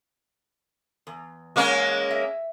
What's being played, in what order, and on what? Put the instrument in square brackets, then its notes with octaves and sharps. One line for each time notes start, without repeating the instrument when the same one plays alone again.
[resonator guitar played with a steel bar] E2
[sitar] G#3 A#3 C#4
[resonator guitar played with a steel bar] E5